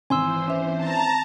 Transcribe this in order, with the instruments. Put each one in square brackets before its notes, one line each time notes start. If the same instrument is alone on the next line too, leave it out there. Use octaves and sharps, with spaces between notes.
[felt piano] G#1 [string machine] E3 C5 [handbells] G#5 C6 E6
[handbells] C#4 E5
[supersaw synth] A5 A#5